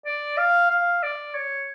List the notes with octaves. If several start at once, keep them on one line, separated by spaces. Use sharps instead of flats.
D5
F5
F5
D5
C#5